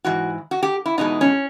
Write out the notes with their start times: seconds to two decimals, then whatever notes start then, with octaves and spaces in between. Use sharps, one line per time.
0.05 G#2 E3 F#4
0.51 F#4
0.63 G4
0.86 E4
0.98 E2 B2 G#3 D#4
1.21 C#4